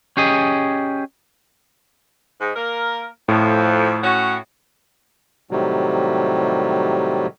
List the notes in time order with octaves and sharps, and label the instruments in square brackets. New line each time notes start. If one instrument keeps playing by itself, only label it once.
[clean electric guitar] C#4 G4 G#4 D#5
[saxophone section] G#2
A#3 A#4
[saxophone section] F2 [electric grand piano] A2
[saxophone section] C#4 F#4
[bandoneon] A2 C3 D#3 F#3 G3